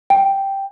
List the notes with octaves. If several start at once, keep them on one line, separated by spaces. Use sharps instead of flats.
G5